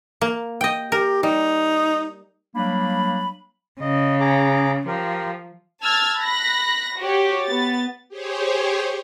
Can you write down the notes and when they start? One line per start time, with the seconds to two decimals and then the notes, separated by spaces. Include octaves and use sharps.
0.21 A#3
0.61 D#5 G5
0.92 G4 A#4
1.23 G3 D#4
2.55 F#3 G3 A#3 D4 F5 B5
3.81 C#3 D#5
4.20 G#4 A#5 D6
4.87 F3 G4 A#4
5.83 A5 E6 F6 G#6 A6
6.19 B5 F#6 A#6
6.97 F#4 G4 C#5
7.44 B3 A6
8.09 G4 G#4 C5 C#5